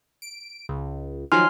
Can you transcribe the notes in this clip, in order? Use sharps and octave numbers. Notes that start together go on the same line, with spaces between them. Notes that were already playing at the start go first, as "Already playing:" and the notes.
D7
C#2
D#3 F3 F#3 G#5 C6 F6